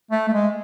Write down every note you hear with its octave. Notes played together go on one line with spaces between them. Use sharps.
A3
A3
G#3